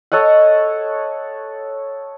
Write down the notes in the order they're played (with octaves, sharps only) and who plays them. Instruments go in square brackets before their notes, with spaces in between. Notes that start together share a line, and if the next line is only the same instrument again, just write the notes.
[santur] A4 C#5 D#5 F#5